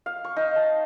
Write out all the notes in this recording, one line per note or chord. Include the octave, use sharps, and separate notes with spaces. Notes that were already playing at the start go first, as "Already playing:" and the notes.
F5
C#6
D#4
A5